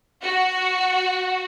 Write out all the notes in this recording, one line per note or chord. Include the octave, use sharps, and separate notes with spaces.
F#4